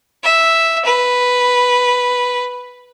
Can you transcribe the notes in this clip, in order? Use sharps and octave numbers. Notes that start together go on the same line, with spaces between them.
E5
B4